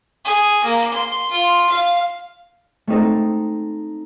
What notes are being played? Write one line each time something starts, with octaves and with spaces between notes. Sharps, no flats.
G#4
A#3
C6
F4
F5
A3 C4 D#4 A4